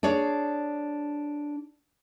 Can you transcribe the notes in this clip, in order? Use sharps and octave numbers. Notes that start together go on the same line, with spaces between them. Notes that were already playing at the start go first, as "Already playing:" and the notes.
D4 G#4 C#5 D5